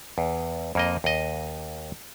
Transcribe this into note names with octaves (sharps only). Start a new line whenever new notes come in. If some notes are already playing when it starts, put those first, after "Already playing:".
E2
F2 A#3 D#5
D#2 D#5